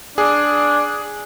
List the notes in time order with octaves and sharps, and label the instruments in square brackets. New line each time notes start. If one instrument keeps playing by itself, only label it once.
[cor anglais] D4 [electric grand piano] G#4